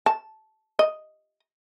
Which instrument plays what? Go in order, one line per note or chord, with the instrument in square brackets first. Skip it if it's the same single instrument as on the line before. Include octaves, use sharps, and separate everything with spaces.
[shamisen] A5
D#5